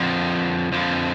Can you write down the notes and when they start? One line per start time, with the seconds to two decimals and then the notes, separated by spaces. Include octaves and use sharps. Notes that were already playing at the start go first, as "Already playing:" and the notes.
Already playing: F2 D3 F3
0.72 F2 D3 F3